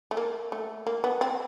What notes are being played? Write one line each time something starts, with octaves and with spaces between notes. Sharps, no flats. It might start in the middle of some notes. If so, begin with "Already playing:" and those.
A3
A#3
A3
A#3
B3
C4